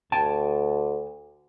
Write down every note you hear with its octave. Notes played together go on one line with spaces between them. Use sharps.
D2 G5 A5